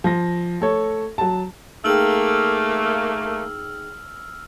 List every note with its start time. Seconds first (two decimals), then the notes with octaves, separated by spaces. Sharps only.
0.04 F3 A#6
0.61 A3 A4 C#5
1.18 F#3 A5
1.84 A3 A#3 D#4 G#4 G5 E6 F6 F#7